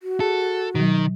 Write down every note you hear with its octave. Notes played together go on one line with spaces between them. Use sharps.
F#4
G#4 A4
B2 D#3 F#3